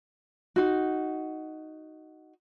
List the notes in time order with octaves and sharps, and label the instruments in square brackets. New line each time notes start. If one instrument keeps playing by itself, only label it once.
[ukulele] D#4 F#4